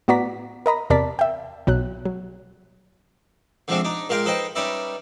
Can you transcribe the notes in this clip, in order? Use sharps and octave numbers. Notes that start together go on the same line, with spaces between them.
A2 B3 F#4 D5 A#5 B6
A#4 D#5 A#5 B5
E2 C3 A#4 D5 A5 B6
E5 G5
B1 B2 F#3 F#6
F#3
D3 F3 G#3 A3 C4 D4
D4 D#4
A#2 G#3 A#4 F5 G5 C6
D#4 A4 B4 C5 D#5 G5
G3 C#4 D#4 B4 D5 E5